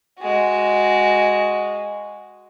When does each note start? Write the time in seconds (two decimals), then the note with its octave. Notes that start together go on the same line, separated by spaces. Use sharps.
0.19 G#3 F#4